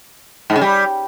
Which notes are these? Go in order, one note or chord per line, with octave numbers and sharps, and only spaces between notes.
G#2
C#3
G3